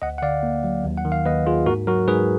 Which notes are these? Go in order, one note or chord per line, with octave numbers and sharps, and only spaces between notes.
D2 D#5 F#5
F#5
D3 D5 F5
A#3
F#3
D#2
F#5
D#3
F5
D#2 B4 D#5
A#3 F4 G#4
G#2 F#4 A#4
F#3 F#4 A#4
G#2 G#4 B4